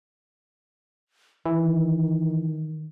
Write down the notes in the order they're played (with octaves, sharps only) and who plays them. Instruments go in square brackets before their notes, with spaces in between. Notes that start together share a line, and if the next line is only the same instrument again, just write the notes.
[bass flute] D#3 [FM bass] E3